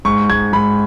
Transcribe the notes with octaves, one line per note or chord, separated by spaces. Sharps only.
G#2 C#6
G#2 G#6
G#2 B5